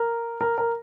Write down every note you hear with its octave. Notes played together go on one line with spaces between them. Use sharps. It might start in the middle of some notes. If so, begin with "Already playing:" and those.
Already playing: A#4
A#4
A#4